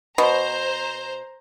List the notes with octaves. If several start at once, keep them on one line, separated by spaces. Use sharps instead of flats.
B2 C5 A#5